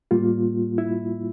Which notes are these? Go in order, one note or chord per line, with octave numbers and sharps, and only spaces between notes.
A2 G3 A#3 F4
E4